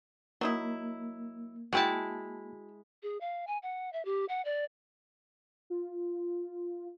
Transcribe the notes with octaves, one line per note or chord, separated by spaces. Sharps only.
F#3 A#3 D#4 E4
G#3 E4 F#4 G5 A5
G#4
F5
G#5
F#5
E5
G4
F#5
D5
F4